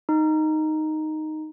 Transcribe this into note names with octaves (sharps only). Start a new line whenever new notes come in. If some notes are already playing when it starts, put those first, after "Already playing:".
D#4